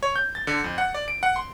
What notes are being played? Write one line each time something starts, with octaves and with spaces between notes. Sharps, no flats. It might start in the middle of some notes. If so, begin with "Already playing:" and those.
C#5
G6
A6
D3
F2
F#5
D5
D7
F#5
C6